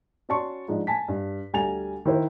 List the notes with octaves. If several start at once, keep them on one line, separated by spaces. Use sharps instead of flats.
C#4 F#4 D5 A5 C6 C#6
G#2 F3 D4
G#5 A5 B6
G2
D2 G3 G#5 A#5 A6 F7
D#3 E4 C5